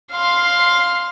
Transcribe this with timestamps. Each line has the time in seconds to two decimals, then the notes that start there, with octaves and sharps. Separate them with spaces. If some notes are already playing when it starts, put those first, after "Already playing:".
0.12 F5 C6